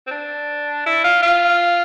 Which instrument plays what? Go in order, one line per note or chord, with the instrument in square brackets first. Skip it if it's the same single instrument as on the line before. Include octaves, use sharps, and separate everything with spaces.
[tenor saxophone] C4
D4
E4
F4
F4